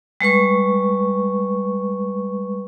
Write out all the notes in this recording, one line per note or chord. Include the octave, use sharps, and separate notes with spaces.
G3 G#3 B4 C#6